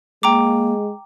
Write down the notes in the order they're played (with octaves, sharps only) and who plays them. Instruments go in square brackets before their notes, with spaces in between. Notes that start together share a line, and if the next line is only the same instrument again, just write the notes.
[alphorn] G#3 [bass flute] A#3 [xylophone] G5 A#5 D6